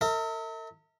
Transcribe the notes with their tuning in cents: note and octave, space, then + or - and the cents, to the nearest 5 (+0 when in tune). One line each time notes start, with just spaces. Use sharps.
A#4 -45 E5 -40